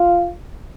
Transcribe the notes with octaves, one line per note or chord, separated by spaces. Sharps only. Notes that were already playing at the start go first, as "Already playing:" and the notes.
Already playing: F4